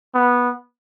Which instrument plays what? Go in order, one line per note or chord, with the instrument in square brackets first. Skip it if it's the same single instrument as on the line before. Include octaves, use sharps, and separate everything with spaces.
[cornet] B3